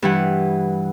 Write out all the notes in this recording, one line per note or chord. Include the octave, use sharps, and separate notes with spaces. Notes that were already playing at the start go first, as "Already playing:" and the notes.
G2 E3 F#5